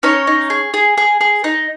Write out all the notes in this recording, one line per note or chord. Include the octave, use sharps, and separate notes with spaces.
C#4 D#4 C#5
D#4
G#4
G#4
G#4
G#4
D#4